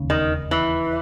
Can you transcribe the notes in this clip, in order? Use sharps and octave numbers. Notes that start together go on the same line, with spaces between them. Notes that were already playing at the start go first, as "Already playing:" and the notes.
Already playing: E1 D#2 C#3
D#3
E3